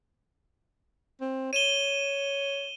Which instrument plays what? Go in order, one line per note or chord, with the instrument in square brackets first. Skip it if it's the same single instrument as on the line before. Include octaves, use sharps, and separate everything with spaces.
[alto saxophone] C4
[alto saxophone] C#5 [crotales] D#7 E7 G7